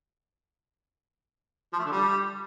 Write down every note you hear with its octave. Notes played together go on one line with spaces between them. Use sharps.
F3
A3
D3
G3